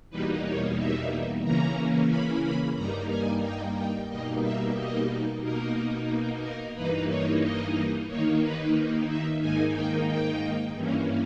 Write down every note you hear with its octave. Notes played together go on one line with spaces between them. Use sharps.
E2 B2 G3 A#3 D#4 B4
C#5
E5
C#3 E3 A#3 C#4 A#5
B5
B5
G2 G3 A#3 D#4 A#5
G#5
G5
G5
B2 G3 A#3 D#4 D#5
E5
D#5
B2 A#3 D#4 A#4
A#4
G2 E3 A#3 D#4 B4
C#5
D#5
D#2 D#3 A#3 D#4 C#5
B4
E5
G#2 D#3 A#3 D#4 G#5
G5
G5
G2 E3 A#3 C#4